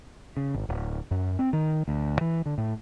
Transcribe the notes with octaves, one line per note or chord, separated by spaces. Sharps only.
C#3
G#1
D1
F#2
C4
D#3
D2
E3
D3
A2